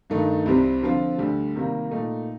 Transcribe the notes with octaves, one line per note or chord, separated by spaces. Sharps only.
G2 D#3 A3 D#4
C2 C3 G3 C4
D3 F3 C4 F4
D2 D3 G3
C3 D#3 G3 A#3
A#2 A3 D#4